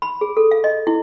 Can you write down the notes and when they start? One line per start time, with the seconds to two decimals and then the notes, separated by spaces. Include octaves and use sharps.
0.02 B5
0.21 G#4
0.37 A4
0.51 F5
0.64 D#5
0.87 E4